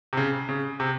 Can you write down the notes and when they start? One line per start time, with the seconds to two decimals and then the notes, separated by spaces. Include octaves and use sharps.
0.13 C3
0.17 C#3
0.49 C#3
0.80 C3